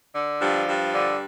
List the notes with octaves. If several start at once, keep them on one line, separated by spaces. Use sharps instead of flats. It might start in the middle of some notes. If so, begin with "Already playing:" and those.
D3
G2 F3
G2
D3